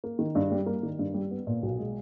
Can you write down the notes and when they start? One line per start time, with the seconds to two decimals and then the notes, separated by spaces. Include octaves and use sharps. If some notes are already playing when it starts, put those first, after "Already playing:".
0.04 A#3
0.19 D#3
0.35 G2
0.52 G3
0.66 A#3
0.83 D#3
0.99 G2
1.14 G3
1.31 B3
1.47 A#2
1.63 B1
1.79 G#3